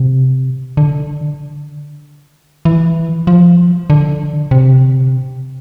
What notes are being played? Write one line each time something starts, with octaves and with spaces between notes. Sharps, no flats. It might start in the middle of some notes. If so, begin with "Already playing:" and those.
Already playing: C3
D3
E3
F3
D3
C3